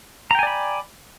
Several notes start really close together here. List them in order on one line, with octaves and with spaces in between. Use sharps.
A#5 G5 G#5 D5 B5